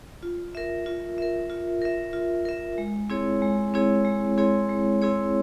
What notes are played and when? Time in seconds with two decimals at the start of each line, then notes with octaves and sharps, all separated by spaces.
0.23 F4
0.55 A#4 E5
0.86 F4
1.18 A#4 E5
1.50 F4
1.82 A#4 E5
2.13 F4
2.45 A#4 E5
2.78 G#3
3.10 C4 E4 G#4 C#5
3.42 G#3
3.74 C4 E4 G#4 C#5
4.05 G#3
4.38 C4 E4 G#4 C#5
4.69 G#3
5.02 C4 E4 G#4 C#5